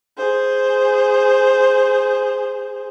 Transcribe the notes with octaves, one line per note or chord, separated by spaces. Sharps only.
G#4 C5